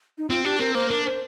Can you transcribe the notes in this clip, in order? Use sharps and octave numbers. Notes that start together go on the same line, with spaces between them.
D#4
C4 F4
D4 G4
C4 A#4
A#3 C5
D4 A#4
C5